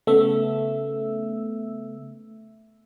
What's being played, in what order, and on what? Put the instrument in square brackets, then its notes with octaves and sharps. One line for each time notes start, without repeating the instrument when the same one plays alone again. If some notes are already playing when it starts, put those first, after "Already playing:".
[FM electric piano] C#3 A3 B3 E5 E6